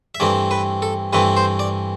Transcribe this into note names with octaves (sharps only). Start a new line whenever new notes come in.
E5
G2 E3 A3 C4 D5
B4
A4
G2 E3 A3 C4 B4
C5
D5